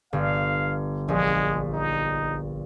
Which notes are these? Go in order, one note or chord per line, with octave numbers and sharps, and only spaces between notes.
G1 F5
A#1 G#3
D#4